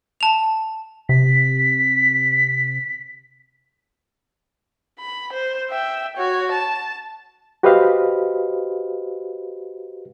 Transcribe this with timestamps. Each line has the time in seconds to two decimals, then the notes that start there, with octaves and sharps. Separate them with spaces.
0.21 A5 F7
1.09 C3 B6
5.00 B5
5.33 C5
5.71 E5 G5
6.16 F#4 C#5
6.52 A5
7.63 F#4 G4 B4 C5 D#5 F5